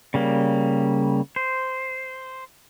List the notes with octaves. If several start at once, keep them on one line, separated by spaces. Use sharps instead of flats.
C#3 G3 A#3
C5